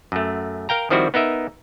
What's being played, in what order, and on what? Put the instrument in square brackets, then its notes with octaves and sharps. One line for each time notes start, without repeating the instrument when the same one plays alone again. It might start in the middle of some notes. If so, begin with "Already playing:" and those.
[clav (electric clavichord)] F#2 A3
A#4 F5 G5 A#5
D#3 F3 G3 C4 E4 F#4
B3 D#4 A#4 E5